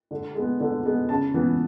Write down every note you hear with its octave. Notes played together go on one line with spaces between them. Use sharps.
D3
G#3 B3
D3
G#3 B3
C#3 A5
E3 B3